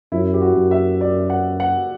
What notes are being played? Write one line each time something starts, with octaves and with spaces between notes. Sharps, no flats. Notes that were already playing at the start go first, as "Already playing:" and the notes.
F#2 E4
G4
F#4
F#2
E5
D5
F#5
F#5